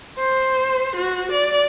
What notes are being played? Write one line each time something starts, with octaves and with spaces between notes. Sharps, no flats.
C5
F#4
D5